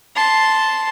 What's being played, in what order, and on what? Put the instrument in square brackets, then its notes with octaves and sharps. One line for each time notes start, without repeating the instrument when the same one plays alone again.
[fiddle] A5 C6